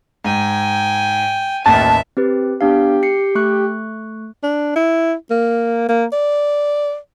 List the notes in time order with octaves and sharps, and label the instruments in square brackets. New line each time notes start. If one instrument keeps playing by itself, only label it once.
[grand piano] G#2 [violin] G5 G#5
[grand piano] A1 D#2 [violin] E5 [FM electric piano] A5
[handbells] C4 G4 B4
[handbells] B3 D4 F5 [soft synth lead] G4
[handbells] C7 C#7
A3 C#6 F#6
[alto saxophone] D4
E4
A#3
A#3
D5